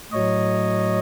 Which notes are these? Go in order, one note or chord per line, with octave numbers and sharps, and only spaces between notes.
A2 F#3 C#5 D#5